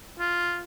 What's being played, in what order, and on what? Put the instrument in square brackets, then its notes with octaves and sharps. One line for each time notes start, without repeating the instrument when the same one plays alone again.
[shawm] F4